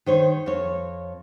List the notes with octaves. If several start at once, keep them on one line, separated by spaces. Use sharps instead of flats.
D#3 C5 C#5
F2 C#5